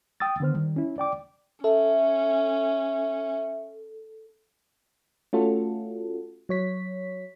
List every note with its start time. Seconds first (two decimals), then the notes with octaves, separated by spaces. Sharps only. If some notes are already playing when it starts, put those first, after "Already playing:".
0.20 G5 D#6 E6 A6
0.40 D3 D#3 B3 C5 F6
0.54 D#3 G3
0.76 C#4 E4
0.98 D5 G5 D6
1.64 C#4 A4 E5
5.33 A3 C#4 F4 F#4 A4
6.49 F#3 C#5 B6